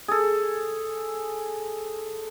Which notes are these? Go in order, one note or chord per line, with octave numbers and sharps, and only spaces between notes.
G#4 A4